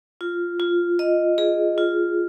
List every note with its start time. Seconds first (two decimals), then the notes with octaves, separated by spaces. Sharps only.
0.21 F4
0.60 F4
0.99 D#5
1.38 G#4
1.78 F4